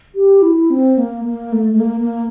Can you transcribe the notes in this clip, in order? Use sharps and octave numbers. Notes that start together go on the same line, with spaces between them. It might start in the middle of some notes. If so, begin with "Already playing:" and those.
G4
E4
C4
A#3
A#3
A3
A3
A#3
A#3